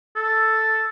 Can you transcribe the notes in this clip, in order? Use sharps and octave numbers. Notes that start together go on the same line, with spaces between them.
A4